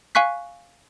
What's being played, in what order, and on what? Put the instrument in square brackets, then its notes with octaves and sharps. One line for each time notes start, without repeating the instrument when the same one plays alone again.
[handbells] F5 G#5 C#6 F#6 B6